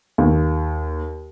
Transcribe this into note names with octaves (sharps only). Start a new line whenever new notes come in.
D#2